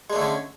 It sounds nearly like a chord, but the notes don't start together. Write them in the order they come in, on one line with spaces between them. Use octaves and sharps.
G#3 D4 A3 D3 C#4